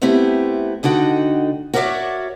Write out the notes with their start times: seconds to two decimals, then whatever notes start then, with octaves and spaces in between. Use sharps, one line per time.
0.02 A3 B3 C4 E4 G4
0.83 D2 D3 D#4 F#4 G5
1.74 F#4 A#4 C#5 D5 E5